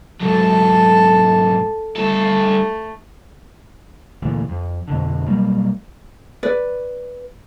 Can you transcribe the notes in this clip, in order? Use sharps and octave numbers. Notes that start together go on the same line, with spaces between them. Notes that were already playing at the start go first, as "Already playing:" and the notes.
G#2 F#3 A4 A5
G2 A3 A4
D2 A#2 E3
F2
F2 B2 D3
B2 F#3 G3 A#3
B4 D5